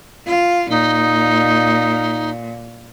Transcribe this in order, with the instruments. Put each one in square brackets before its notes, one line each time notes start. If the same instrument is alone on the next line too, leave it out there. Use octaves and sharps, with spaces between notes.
[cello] F4
[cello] A#2 [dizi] D#4